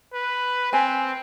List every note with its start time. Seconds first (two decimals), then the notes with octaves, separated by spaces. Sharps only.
0.13 B4
0.73 C4 G#5